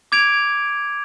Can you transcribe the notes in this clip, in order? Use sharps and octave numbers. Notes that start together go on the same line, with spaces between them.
D6 G#6 D7 F7